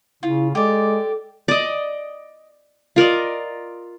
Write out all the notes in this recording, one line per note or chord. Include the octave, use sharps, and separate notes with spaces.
C#3 E4 F4
G#3 G4 A4 D5
D5 D#5
F4 A#4 D5 D#5